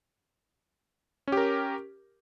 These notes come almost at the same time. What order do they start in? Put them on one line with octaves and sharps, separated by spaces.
C#4 G4 A#4